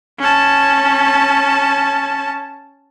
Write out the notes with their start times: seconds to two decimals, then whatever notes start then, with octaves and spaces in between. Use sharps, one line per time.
0.19 C#4 A5